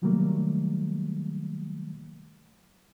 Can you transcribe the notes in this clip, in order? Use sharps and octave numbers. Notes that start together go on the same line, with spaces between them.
C3 D#3 F#3 G3 A3 A#3